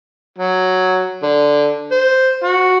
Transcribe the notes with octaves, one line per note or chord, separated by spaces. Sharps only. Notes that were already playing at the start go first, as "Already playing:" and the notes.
F#3
D3
C5
F#4